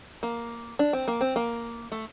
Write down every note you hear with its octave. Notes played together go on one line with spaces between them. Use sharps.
A#3
D4
C4
A#3
C4
A#3
A3